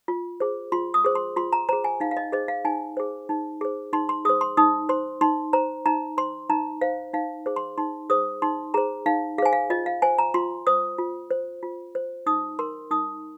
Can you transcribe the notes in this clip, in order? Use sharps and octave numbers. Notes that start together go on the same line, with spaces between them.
F4
G#4 C5
F4 C6
D#6
G#4 C5
C6
F4 C6
A#5
G#4 C5 A#5
G#5
D#4 F5
F5
D#5
G#4 C5 D#5
F5
D#4 G#5
G#4 C5
D#4
G#4 C5
D#4 C6
C6
G#4 C5 D#6
C6
D#4 D#6
C5 C6
D#4 C6
C5 A#5
D#4 A#5
C5 C6
D#4 A#5
C5 F5
D#4 F5
G#4 C5
C6
D#4 C6
G#4 C5 D#6
D#4 C6
G#4 C5 A#5
D#4 F5
G#4 C5 F5 G#5
F5
F4 D#5
F5
C5 G#5
A#5
F4 C6
C5 D#6
F4
C5
F4
C5
D#4 D#6
A#4 C6
D#4 D#6